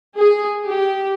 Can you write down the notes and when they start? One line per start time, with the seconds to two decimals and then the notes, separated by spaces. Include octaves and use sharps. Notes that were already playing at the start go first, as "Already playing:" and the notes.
0.18 G#4
0.65 G4